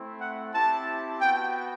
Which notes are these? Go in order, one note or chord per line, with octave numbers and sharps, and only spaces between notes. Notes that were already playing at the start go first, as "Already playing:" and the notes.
Already playing: A3 C4 E4
F#5
C4 E4 G4 A5
B3 G5
F#4